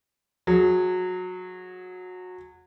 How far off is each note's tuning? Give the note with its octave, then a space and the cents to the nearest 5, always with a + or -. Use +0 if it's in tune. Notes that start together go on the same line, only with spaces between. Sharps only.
F#3 -20 G#4 +0